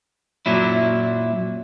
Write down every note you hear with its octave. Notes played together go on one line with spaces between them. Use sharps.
F#2 A#2 F#3 E4